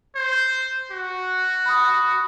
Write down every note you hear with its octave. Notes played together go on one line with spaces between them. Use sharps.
C5
F#4
B5 D#6